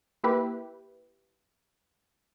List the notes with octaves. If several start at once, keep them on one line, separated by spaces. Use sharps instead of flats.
A#3 E4 G4 B4